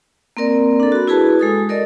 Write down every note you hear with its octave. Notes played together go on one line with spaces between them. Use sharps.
A#3 C4 A#4 D5
D4 A4
F#4 B5
E4 F#4 G#4 B4 A5
G#3 A4 D#6
A4 A#4 D5 D#5